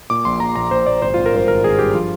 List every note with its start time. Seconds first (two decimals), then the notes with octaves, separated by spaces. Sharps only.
0.10 A#2 D6
0.25 A#1 C6
0.40 A#1 A#5
0.56 A#1 A#5
0.71 A#1 C5
0.86 A#1 D5
1.02 G#1 C5
1.14 G#1 F4
1.26 A#4
1.33 G2 C5
1.48 G#1 A#4
1.64 G#1 G#4
1.79 G2 G4
1.95 F3 F4